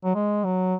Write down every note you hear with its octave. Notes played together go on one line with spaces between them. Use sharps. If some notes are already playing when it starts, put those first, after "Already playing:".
F#3
G#3
F#3